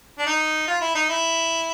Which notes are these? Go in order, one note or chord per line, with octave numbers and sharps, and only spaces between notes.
D4
D#4
F4
E4
D#4
E4